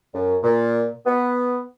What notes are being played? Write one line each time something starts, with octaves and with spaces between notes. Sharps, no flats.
F#2
A#2
B3